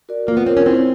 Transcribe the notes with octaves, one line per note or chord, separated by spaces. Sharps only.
F#4 A#4 D5
A#3 F4
B3
C4 A#4 C#5
C#4
C4 E4